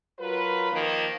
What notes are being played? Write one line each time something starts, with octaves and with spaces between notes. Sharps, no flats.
F#3 F4 A#4 B4
D#3 F3 A#3